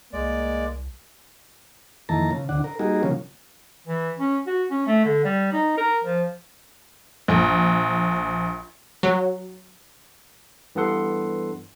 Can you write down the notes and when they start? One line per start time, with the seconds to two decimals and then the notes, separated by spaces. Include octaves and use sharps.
0.13 C2 G#3 A#3 D5
2.09 F2 D#3 E3 A#3 A5 A#5
2.31 C#3
2.49 D2 D3 D4 F#5
2.64 A#4
2.79 G3 A#3 D#4 F#4 G#4 A#4
3.03 C#3 F3 F#3 A#3 C#4
3.87 E3
4.19 C#4
4.46 F#4
4.70 C#4
4.86 A3
5.05 D3
5.24 G3
5.52 D#4
5.77 A#4
6.04 F3
7.28 A#1
9.03 F#3
10.75 G2 E3 B3 A4 F#5 C6